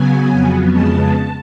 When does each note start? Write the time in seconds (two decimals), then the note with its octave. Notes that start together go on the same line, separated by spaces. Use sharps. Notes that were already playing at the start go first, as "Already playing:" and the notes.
Already playing: C#3 F#3 B3 G#5
0.30 F2 C#3 F#3 B3
0.70 F2 C#3 G#3 B3 A5